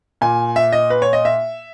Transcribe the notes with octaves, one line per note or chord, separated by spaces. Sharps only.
A#2 G#5
E5
D#5
B4
C#5
D#5
E5